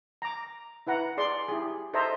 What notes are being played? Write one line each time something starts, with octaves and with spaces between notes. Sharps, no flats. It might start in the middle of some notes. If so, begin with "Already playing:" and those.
A#5 D6
E4 B4 F#5 A#5
G#4 D5 C6
E4 G4 G#4
A4 C5 D#5 E5 A#5